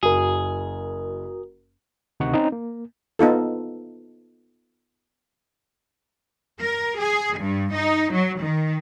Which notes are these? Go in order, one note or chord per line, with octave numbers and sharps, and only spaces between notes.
F#1 F#4 G#4 A#4
D2 C3 D#3 D#4 F#5 C#6
C4 C#4 D#4 D#5
A#3
B3 D#4 F4 A4
A#4
G#4
G2
D#4
F#3
D#3